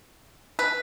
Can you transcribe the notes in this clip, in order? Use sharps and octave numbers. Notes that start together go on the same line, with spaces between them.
B4